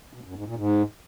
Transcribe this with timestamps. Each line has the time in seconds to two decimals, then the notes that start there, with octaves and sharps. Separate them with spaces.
0.13 B2
0.24 F#2
0.35 G#2
0.46 A#2
0.56 G#2